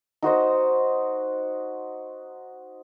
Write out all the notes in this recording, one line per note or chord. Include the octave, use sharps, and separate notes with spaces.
D#4 F#4 C5 D#5